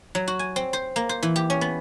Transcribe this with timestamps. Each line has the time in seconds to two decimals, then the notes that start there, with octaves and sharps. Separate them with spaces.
0.15 F#3
0.28 F#4
0.39 G#5
0.56 C4
0.73 C5
0.96 A#3
1.09 C5
1.23 E3
1.36 G4
1.50 C#4
1.61 B3